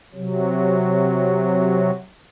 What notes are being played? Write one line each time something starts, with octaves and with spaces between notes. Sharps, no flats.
C3 F#3